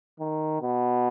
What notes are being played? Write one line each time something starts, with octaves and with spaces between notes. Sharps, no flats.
D#3
B2